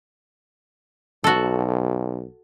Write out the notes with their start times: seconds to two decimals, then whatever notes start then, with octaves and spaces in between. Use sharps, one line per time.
1.24 B1 F#4 A4